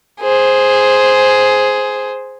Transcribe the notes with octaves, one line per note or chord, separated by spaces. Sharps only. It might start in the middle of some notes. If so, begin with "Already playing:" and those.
G#4 C5